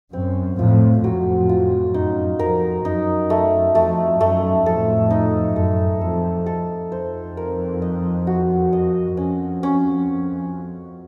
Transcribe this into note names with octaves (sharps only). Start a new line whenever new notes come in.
F#2 C4
F2 A2 F4
F2 A2 F#3
F4
F#2 D#4
F2 A#4
F#2 D#4
A3
F2 A3
F#2 A3
F2 A2 A4
D#4
F#2 A4
F2 A4
A4
F2 C5
A#4
D#5
F#4
D#5
F2 C#4
C#4